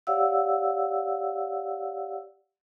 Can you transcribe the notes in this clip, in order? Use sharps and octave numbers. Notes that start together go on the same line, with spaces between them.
G4 C#5 D5 F5 F#5 E6